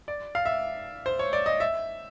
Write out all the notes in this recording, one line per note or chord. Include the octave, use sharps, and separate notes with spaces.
D5
F5
E5
C5
C#5
D5
D#5
E5